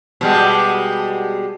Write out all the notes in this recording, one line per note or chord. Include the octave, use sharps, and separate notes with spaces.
B2 G3 G#3